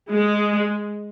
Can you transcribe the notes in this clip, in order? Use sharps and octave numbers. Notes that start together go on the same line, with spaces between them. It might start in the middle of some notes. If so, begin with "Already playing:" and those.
G#3